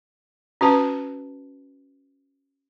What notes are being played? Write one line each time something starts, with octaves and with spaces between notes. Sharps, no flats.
C#4 F#4 B4 A5